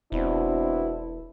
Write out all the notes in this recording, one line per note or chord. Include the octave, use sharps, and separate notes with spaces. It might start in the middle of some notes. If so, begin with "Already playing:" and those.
E1 B2 C4 D4 E4